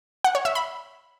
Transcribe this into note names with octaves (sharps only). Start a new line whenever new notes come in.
F#5
C#5
E5
B5